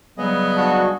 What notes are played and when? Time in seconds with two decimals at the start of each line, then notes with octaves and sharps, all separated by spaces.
0.18 C#3 F#3 G3 B3 G#4 D#5
0.55 D4 F#4